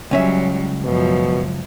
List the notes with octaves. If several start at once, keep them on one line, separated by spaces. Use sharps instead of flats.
C#2 F#3 G3 C#4 E5
F#2 B2 F3